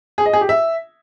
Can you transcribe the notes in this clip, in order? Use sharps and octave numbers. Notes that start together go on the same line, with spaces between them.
G#4
D#5
G#4
G4
E5